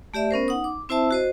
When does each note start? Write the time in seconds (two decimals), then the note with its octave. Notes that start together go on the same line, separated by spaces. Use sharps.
0.14 A3 G4 D5 E5
0.31 B3 C#4 A#4 C5
0.48 D#4 F#5 D#6
0.64 D6
0.89 C4 E4 C5 E5 A5 E6
1.11 F#4 C5 D#5